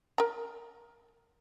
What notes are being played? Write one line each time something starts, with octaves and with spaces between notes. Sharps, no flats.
A#4 A#5